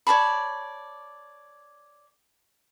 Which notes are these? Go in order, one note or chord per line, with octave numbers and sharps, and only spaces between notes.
C#5 D5 A5 B5